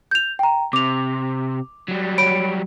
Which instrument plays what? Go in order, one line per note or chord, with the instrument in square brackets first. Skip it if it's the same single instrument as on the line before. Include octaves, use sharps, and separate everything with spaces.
[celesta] G6 F7
G5 A#5
[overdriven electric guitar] C3 [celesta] D6 F7
[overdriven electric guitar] F#3 G3
[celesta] C#5 B5 D7